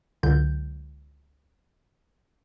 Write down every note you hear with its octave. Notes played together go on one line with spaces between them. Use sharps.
C#2 D3 F#3 G6